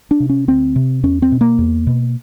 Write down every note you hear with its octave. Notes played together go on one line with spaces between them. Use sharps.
D4
C3
C#4
D2 C4
C3
E2 C#4
C4
B2
A#3
E2
B2